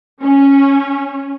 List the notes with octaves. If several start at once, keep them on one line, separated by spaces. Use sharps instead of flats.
C#4